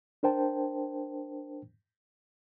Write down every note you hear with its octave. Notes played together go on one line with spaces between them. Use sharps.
D4 A#4 C5 G5 A5